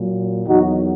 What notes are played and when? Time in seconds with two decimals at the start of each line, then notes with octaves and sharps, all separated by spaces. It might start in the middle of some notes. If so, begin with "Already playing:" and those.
Already playing: A#2 F#3
0.46 E2 D#3 F#3 D#4 F#4